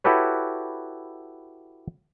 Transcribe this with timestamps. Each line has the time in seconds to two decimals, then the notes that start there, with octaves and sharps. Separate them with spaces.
0.04 E4 F#4 G4 A4 B4 C#5